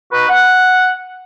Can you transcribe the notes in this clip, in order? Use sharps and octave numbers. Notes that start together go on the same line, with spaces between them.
D#4 F#4 B4
F#5